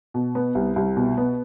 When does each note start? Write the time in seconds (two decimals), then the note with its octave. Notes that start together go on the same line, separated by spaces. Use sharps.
0.14 B2
0.35 B3
0.55 C2
0.76 C2
0.97 B2
1.17 B3